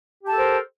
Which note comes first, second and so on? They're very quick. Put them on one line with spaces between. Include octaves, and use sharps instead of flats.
G4 A5 A4 A#4 C5